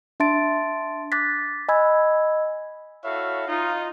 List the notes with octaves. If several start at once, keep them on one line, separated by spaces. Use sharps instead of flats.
D4 E5 A5 C6 A6 D7
D6 F#6 A6 B6
D#5 G#5 B5 E6 G#6
E4 F#4 A4 C#5 E5 F5
D#4 F4